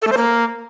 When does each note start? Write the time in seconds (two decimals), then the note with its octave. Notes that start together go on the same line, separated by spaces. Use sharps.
0.02 A4
0.07 A3
0.12 C5
0.17 A#3